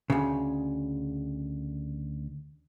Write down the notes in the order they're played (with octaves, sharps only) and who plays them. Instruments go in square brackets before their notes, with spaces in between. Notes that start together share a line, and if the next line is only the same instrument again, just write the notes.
[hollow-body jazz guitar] D2 C#3